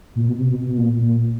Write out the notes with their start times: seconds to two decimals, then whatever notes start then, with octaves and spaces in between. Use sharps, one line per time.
0.16 A#2
0.27 B2
0.38 C3
0.50 B2
0.67 B2
0.78 A#2
1.01 A#2